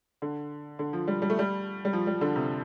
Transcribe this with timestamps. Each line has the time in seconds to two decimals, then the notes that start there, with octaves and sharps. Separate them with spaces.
0.22 D3
0.79 D3
0.93 F3
1.08 G3
1.22 G3
1.30 A3
1.39 G3
1.85 G3
1.93 F3
2.07 G3
2.21 D3
2.36 C3